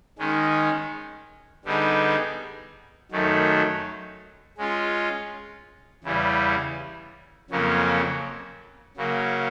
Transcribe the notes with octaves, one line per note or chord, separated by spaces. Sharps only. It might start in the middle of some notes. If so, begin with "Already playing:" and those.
D#3 G#3 C#4
D3 G3 B3 D#4 G#4
F#2 D#3 F#3 A3
G#3 C#4 F4
E2 C#3 E3 G3
F2 C#3 F#3 A#3 C#4
C#3 F#3 A#3